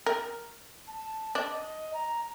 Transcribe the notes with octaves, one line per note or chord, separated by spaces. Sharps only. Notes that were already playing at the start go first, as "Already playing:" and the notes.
A#4
A5
D4 D#5
A#5